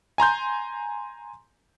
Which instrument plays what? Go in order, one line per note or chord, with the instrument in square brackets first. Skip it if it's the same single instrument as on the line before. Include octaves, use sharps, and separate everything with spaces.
[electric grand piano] G#5 A#5 C6 G6